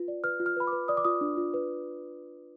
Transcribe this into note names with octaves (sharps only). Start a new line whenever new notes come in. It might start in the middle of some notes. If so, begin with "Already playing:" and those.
Already playing: F4 B4
D5
B4 F6
F4
F6
B4 B5
B4 D6
D5 D#6
D6
F4 D#6
D4
F4
B4